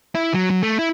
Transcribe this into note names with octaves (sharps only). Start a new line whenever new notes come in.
E4
F#3
F#3
A3
E4